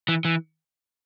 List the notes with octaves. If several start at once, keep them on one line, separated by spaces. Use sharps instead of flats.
E3
E3